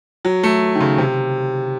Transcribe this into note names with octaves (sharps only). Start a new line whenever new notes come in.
F#3
A3
D#3
C#3
C3